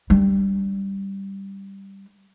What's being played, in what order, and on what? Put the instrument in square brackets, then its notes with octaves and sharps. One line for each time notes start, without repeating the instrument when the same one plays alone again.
[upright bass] G3 D4